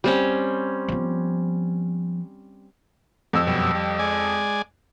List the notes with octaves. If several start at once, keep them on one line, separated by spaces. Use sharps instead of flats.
G3 C4 C#4
F3 B3
F2 E6
F#2 B2 G3
G3
G#3 D5 G#5